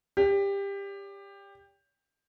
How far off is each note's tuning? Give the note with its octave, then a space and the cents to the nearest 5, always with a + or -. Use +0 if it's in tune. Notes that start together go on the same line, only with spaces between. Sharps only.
G4 +20 C#5 +45